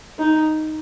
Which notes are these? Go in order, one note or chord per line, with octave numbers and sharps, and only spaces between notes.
D#4